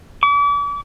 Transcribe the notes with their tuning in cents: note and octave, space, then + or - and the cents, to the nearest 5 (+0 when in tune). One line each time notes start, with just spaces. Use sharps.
D6 -40